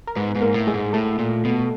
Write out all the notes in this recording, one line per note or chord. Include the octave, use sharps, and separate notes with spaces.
A#4
G#2 B3 B4
G#2
A#3 A#4
A2
G#3 G#4
G#2
A2 A3 A4
A#2
B2